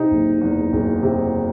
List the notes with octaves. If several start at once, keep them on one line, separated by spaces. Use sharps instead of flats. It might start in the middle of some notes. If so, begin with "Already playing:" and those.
Already playing: C3 D#4
F#1
E2
F#1
C3